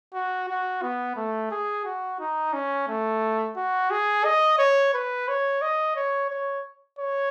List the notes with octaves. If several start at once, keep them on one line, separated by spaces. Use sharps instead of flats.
F#4
F#4
B3
A3
G#4
F#4
D#4
C#4
A3
F#4
G#4
D#5
C#5
B4
C#5
D#5
C#5
C#5
C#5